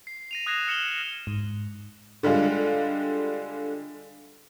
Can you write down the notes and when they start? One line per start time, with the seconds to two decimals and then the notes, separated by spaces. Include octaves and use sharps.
0.07 C7
0.31 A#6 D#7 F7
0.46 D#6 F#6 G#6 A#6 C7 E7
0.68 F6 C#7 E7 F#7 G7
1.27 G#2
2.23 D3 G3 G#3 F4